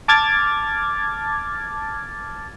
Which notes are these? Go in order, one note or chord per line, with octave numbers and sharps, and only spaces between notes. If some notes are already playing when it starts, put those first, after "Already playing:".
A5 D6 F6 G#6 A6